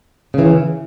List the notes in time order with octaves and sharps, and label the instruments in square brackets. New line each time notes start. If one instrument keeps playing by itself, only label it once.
[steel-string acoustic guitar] C#3 E3